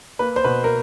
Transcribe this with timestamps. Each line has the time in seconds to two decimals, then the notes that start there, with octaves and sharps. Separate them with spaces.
0.19 A#3 B4
0.36 C5
0.44 B2 B4
0.64 A#4